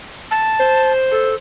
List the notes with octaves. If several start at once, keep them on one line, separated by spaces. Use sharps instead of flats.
A5
C5
A4